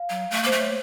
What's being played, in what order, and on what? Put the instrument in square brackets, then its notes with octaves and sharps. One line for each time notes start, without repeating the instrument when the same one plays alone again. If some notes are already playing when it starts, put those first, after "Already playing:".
Already playing: [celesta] F5
[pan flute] F#3
A3
[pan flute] A#3 [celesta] C5
[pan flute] A3
[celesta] C#5